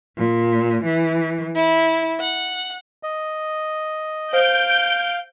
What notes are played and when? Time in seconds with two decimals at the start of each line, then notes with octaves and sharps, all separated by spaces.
0.17 A#2
0.84 E3
1.54 E4
2.19 F#5
3.03 D#5
4.33 C5 F5 G6 D7